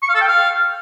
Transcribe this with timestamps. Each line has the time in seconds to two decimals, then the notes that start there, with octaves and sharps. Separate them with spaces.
0.03 C#6
0.09 F5
0.15 A4
0.21 G5
0.27 F5